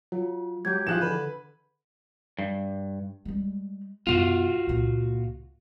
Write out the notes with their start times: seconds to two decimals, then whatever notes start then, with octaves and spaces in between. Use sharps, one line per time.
0.12 F#3 F4
0.65 F#3 G#3 G4 G6 G#6
0.87 E3 F3 F4 G#4 F#6 E7
1.01 D3 B4
2.39 G2
3.25 G3 G#3
4.07 B1 F#2 F4 F#4
4.67 C#2 A#2